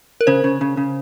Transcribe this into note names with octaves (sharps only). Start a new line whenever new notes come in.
A#4
C#3 C5
C#3
C#3
C#3